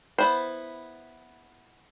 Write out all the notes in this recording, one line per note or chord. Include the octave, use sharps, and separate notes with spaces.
B3 E4 C5